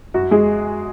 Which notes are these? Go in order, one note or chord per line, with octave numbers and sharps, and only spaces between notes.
F#2 F#4
G#3 G#4